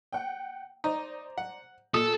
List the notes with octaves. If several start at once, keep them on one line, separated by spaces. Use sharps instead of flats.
F#5 G5
D#4 C5 D5 A#5
F#5
A#2 A4 D#6